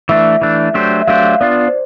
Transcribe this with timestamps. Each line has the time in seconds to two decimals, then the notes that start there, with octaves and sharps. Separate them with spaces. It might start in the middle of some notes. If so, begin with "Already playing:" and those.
0.09 E3 A3 D4 E5
0.41 E3 A3 D4
0.74 F#3 A3 D4 G4 C5
1.02 E5
1.07 F#3 A3 D4 G4 C5 F5
1.41 B3 D4 F4 D5
1.68 C5